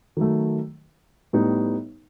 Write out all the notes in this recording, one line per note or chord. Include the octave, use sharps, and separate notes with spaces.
D#3 F#3 A3
A2 G3 B3 D#4